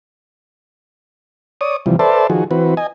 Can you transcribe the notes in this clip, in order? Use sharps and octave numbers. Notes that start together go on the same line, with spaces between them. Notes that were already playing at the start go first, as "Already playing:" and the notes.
C#5 D5 D#6
C3 E3 F3 G3
A4 B4 C5 D5 E5 A5
D#3 F3 F#4 G#4
E3 C4 F#4 B4
D#5 G#5